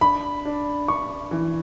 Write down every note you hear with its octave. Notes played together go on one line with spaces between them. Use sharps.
D4 B5
D4
D4 C#6
E3